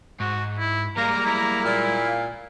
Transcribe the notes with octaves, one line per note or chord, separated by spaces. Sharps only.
G#2 F#4
E4
G3 G#3 A#3 A#4 A#5
E4
A#2 F5